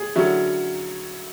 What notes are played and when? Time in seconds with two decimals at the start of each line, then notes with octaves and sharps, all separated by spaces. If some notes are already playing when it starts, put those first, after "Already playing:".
Already playing: G#4
0.16 D3 F#3 C#4 E4